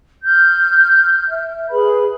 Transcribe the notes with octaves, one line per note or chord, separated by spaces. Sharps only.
F6 G6
E5
G#4 B4 B5